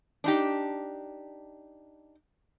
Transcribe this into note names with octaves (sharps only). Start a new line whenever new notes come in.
D4 D#4 G4